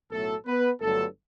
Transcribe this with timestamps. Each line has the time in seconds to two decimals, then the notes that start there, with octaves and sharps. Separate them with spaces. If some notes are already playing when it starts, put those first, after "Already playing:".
0.11 B1 A2 F#3 A3 A4
0.46 B3 B4
0.80 G1 G2 F#3 A3 A4